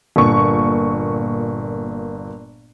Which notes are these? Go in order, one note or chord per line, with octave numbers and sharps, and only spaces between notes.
G1 A#2 C#6